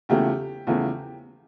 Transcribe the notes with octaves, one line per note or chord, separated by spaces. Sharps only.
E2 C#3 F3 A3 G4
E2 C#3 F3 A3